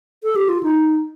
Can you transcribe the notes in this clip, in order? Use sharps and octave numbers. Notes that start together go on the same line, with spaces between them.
A4
G4
F4
D#4